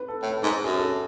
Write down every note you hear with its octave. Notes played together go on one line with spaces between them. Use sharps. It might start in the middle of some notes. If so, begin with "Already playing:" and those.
Already playing: B4
A4
A2 A4
A4
G#2
A4
F#2 G#4
A4